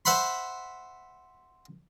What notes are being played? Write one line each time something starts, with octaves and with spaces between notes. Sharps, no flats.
C5 E5 F#5 B5 C6